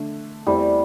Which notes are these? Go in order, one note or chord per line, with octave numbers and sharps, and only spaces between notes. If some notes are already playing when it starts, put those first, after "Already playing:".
Already playing: D3 A3 D4
E2 E3 G3 A3 C4